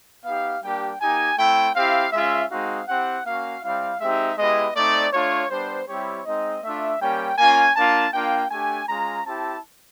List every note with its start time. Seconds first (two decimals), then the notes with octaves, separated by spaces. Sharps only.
0.25 B3 D#4 G4 F5
0.63 G3 A#3 D4 G4 G5
1.01 A#3 D#4 G4 G#5
1.38 A3 C4 E4 G5
1.76 C4 E4 G4 F5
2.13 G#3 C#4 F4 E5
2.51 G#3 C4 D#4 F#4 F5
2.88 C4 E4 G4 F#5
3.25 A#3 C#4 F#4 F5
3.63 G3 C4 E4 F5
4.00 G#3 C4 D#4 G4 E5
4.38 G#3 B3 E4 G4 D#5
4.76 A3 C4 D#4 D5
5.13 A3 D4 F4 C#5
5.51 G3 B3 D4 C5
5.88 G3 C4 E4 G4 C#5
6.25 G#3 C4 D#4 D#5
6.63 A3 D4 F4 E5
7.01 G3 A#3 C#4 G5
7.38 A#3 C#4 F4 G#5
7.76 A#3 D4 F4 A5
8.14 A#3 D4 F4 G5
8.51 A3 D4 G4 G#5
8.89 G#3 C#4 F4 A#5
9.26 C4 E4 G4 A5